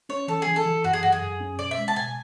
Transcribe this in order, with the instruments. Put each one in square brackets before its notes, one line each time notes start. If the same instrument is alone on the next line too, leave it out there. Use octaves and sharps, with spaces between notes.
[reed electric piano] C#4 [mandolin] C#5
[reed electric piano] E3 [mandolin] A4
[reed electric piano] E3 [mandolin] G#4
[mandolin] A4
[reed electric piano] E3
[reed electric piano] F#2 [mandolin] F#4
[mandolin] G#4
[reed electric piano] F#2 [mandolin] F#4
[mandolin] G#4
[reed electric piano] F#2
C#4
[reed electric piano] B2 [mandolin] D5
[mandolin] E5
[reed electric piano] G#3
[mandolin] A5
[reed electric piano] B2 [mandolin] G#5